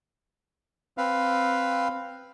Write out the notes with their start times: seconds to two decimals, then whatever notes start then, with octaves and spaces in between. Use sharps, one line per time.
0.98 C4 B4 F5